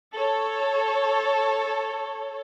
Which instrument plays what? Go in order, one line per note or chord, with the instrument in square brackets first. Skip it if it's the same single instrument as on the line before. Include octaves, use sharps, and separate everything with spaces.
[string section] A4 C#5